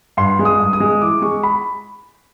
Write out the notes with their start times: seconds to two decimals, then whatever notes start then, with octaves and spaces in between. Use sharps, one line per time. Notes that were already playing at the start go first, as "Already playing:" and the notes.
0.17 G2 C6
0.39 G#3
0.45 D#6
0.60 G2
0.73 D#6
0.80 G#3
1.01 E3 D6
1.22 G#3 C#6
1.43 B5